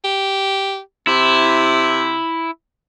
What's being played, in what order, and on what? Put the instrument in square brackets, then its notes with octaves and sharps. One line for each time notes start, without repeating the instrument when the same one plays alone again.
[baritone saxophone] G4
[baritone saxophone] C3 [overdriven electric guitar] E4